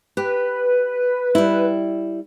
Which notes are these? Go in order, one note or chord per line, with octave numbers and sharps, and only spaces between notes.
G4 B4
G3 E4